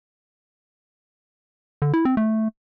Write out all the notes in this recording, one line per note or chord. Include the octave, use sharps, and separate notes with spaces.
D3
E4
C4
A3